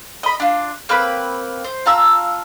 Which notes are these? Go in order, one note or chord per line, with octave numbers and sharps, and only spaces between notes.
D#5 B5
D4 F4
A#3 C4 B4 B5
C5
F4 A5 A#5 E6